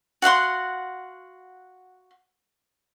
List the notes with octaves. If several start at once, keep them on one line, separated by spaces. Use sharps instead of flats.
F#4 F5 F#5 C6